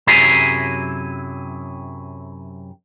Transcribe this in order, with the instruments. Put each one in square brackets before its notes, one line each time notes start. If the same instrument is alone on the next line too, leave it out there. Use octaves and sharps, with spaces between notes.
[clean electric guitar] F#2 C3 F#3 E4 G#4 A#5